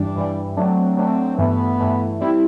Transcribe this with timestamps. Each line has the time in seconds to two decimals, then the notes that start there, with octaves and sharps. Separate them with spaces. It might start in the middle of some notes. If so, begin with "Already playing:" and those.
Already playing: G2 E3 G3 D4
0.16 G2 E3 G3
0.57 F#3 A3 C4 D4
0.97 F#3 A3 C4 D4
1.38 G2 E3 A3 B3
1.79 G2 E3 A3
2.21 G3 C4 E4